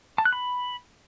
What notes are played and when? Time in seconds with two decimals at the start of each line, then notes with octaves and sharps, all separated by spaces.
0.18 A5
0.25 F#6
0.33 B5